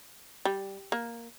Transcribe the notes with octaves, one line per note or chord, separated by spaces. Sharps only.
G3
A#3